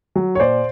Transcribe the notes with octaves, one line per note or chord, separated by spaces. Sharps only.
F#3
C#5
A#2 C5 D5